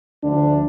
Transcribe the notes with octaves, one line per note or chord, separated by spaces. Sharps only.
D2 D3 F3 D4